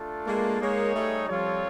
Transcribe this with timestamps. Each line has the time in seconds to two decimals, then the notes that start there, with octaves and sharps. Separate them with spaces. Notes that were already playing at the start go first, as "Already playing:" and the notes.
Already playing: A3 D4 F4 A4
0.26 G#3 A#3
0.60 G#3 A#3 D#4 G#4 C#5
0.94 G3 A3
1.28 F3 G3 C4 F4 A4 C#5